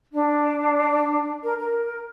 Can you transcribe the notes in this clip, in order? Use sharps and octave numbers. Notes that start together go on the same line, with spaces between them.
D4
A#4
A#4